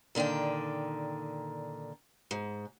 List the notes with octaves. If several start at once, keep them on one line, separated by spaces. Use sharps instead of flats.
A#2 D3 D#3 D5 G5
G#2